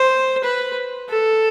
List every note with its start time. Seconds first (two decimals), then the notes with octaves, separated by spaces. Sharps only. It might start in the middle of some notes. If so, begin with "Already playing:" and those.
Already playing: C5
0.44 B4
1.09 A4